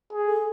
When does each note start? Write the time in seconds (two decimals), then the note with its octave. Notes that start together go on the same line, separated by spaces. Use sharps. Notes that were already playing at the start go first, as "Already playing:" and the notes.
0.13 G#4
0.27 A4